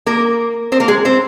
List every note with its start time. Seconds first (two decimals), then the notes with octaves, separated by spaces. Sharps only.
0.06 A#3 A#4
0.72 C4 C5
0.80 A#3 A#4
0.88 G#3 G#4
1.05 C4 C5